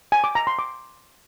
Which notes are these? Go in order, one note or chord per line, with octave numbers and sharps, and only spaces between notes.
G#5
D6
A#5
C6
D6